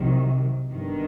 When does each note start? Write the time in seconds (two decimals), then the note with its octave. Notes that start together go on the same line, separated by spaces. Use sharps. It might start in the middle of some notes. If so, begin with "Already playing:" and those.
Already playing: C2 C3 D#3 F#3
0.70 G1 G2 D#3